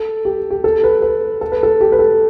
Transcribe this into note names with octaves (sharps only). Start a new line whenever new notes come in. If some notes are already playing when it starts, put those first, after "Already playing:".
Already playing: A4
G4
G4
A4
B4
B4
A4
B4
A4
G4
B4
A4